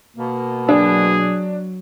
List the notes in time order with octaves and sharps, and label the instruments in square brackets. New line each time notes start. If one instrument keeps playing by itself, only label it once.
[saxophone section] B2 A#3
[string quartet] F#3 [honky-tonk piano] D4 [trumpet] G#4